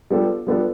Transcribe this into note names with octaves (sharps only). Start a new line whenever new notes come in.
G3 B3 D4 F4 A4
G3 B3 D4 F4 A4